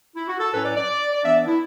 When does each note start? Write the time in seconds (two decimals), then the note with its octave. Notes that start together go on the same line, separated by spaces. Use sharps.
0.16 E4
0.28 F#4
0.39 A4
0.51 A2 F#3 C#4 B4
0.64 D5
0.75 D5
1.13 D5
1.24 E3 B3 D4 E5
1.36 D5
1.47 E4